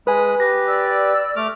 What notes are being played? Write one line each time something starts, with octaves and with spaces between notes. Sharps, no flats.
G#3 B4 G#5 B5 D#6
G4 B4 A#6
D5 E6
A3 D6 F6